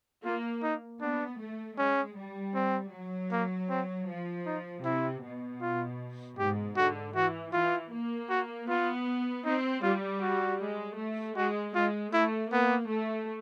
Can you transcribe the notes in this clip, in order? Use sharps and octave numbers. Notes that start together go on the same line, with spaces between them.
A#3 F4
D#4
B3 D4
A3
G#3 C#4
G3
C4
F#3
A#3
C4
F3
D#4
C3 E4
B2
F4
G#2 G4
D3 F#4
E3 F#4
E3 F4
A#3
F#4
B3 F4
C4 D#4
G3 F4
F#4
G#3
A3
G#3 F#4
G#3 F4
A3 E4
A#3 B3
A3